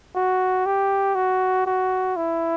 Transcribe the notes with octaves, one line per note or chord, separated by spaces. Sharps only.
F#4
G4
F#4
F#4
E4